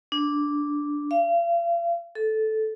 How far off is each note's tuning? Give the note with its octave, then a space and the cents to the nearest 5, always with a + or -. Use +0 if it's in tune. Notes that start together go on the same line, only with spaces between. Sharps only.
D4 -5
F5 -40
A4 -10